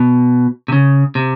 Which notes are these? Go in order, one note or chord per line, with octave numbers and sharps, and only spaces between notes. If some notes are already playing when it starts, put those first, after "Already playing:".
Already playing: B2
C3
C#3
C3